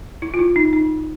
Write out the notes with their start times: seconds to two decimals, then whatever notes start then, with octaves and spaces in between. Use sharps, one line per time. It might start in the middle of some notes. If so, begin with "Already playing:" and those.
0.22 E4
0.34 F4
0.39 E4
0.56 D#4
0.73 D#4